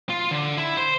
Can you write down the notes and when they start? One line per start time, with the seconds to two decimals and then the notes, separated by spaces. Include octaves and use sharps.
0.09 F4
0.31 D3
0.57 E4
0.77 C5